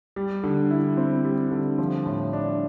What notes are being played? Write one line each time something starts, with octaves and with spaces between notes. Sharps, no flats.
G3
D3
E4
C4
G3
D3
F3
A2
D4